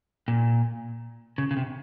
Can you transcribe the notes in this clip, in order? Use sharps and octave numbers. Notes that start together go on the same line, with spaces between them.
A#2
C#3
C#3
C3